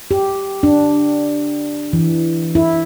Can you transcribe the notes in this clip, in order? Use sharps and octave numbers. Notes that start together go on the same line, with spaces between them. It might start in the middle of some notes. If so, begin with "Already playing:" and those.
G4
D4
E3
E4